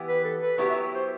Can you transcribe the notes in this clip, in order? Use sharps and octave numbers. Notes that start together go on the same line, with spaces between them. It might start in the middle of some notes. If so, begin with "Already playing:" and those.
Already playing: E3 B3 E4 G4
B4
A4
B4
F#3 B3 E4 G4 B4
E5
C5